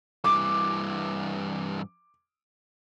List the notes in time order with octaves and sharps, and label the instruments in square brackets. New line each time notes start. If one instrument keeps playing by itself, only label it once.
[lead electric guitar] G2 E3 [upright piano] D6